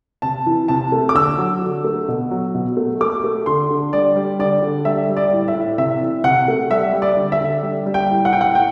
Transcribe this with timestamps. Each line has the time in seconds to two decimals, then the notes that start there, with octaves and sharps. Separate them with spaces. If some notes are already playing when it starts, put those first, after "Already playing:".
0.22 C3 A5
0.46 E3
0.68 C3 A5
0.92 A3
1.09 D6
1.15 D3 E6
1.38 F#3
1.62 D3
1.84 A3
2.08 B2
2.31 F#3
2.55 B2
2.77 A3
3.01 A3 D6
3.24 A3
3.46 D3 C6
3.70 D3
3.93 G3 D5
4.16 G3
4.39 D3 D5
4.62 D3
4.85 G3 E5
5.09 G3
5.17 D5
5.32 A2
5.48 E5
5.55 A2
5.78 C3 E5
6.02 E3
6.24 C3 F#5
6.48 A3
6.70 G3 E5
6.93 G3
7.02 D5
7.17 D3
7.32 E5
7.41 D3
7.63 G3
7.86 G3
7.94 G5
8.10 A2
8.25 F#5
8.32 A2 G5
8.41 F#5
8.55 A2 G5